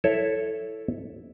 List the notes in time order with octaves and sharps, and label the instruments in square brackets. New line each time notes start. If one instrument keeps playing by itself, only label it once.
[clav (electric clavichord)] E4 A4 C#5 E5